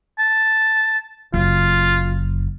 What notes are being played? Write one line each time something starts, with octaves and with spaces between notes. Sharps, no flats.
A5
F#1 F4